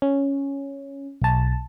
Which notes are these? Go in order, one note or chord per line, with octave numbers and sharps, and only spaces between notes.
C#4
B1 A5